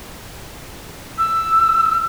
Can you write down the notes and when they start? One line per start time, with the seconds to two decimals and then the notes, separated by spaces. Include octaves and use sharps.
1.18 E6